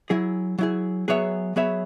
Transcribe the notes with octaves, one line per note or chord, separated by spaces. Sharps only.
F#3 E4 G#4
F#3 E4 G#4
F#3 B3 G#4 C#5 E5
F#3 B3 G#4 C#5 E5